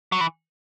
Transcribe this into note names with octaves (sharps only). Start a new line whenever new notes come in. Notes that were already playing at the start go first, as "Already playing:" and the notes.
F#3
E3